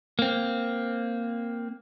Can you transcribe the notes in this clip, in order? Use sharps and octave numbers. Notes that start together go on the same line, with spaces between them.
A#3 C4